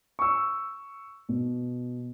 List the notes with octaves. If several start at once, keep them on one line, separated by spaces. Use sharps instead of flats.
C#6 E6
B2